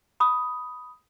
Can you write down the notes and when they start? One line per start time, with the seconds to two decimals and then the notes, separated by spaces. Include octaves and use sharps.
0.20 B5 D#6